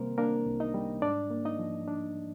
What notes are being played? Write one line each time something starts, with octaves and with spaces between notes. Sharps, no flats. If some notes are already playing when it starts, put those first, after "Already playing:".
Already playing: C3 G3 A#3 C4 A#4 C5
A#3 D4 A#4
C2
D#4 D#5
G3
G#2 D4 D5
A#3
D#4 D#5
F3
D4